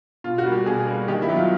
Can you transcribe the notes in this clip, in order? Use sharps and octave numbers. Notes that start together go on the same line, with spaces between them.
B2 F4
F#4
G3 A#3
G4
B2 G#4
G3 A#3
D#3 G4
E4
F#3 B3
F4